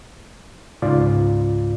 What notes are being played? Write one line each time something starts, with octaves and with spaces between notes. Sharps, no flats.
C#2 G#2 F4 D5